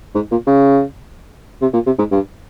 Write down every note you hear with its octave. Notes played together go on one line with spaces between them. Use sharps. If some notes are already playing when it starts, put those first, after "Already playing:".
G#2
A#2
C#3
C3
A#2
C3
G#2
G2